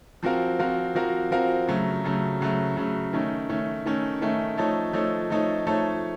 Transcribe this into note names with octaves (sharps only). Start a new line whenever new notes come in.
F3 C4 F#4 A#4 F5
F3 C4 F#4 A#4 F5
F3 C4 F#4 A#4 F5
F3 C4 F#4 A#4 F5
C#3 F#3 A3
C#3 F#3 A3
C#3 F#3 A3
C#3 F#3 A3
D#3 A3 C#4
D#3 A3 C#4
D#3 A3 C#4
D#3 A3 C#4
F3 A3 D#4 A4 C#5
F3 A3 D#4 A4 C#5
F3 A3 D#4 A4 C#5
F3 A3 D#4 A4 C#5